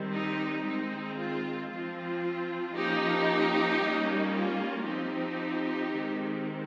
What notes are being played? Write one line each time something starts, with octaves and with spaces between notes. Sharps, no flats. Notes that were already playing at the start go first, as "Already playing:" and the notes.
Already playing: D#3 G3 C4
D#4 G4
D#3 G#3 C4 D#4
F4
F3 C4 F4
F3 A#3 C#4 D#4 G4
G3 A#3 C#4
F4
F3 C4 D#4 G4
D#3 G#3 C4